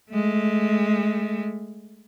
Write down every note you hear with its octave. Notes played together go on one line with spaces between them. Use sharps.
G#3 A3